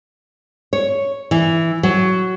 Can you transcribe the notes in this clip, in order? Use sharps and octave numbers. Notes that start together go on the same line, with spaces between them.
C#5
E3
F#3